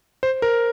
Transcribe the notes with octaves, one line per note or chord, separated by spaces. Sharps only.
C5
A#4